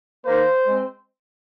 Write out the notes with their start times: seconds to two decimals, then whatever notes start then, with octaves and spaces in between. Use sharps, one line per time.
0.26 D#3 A#3 C5
0.67 G#3 C4